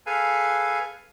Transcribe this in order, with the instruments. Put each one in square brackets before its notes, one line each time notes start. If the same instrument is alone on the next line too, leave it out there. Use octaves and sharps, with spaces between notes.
[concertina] G#4 A4 B4 F5 G#5